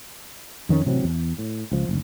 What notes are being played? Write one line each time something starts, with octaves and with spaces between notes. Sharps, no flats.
F2 D#3 B3 C#4
A1 C3 F#3 C4
E2
A2
C#2 F3
F#1 D2